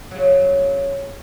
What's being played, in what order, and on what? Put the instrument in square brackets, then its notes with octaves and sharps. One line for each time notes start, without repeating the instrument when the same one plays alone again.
[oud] C#3 F#3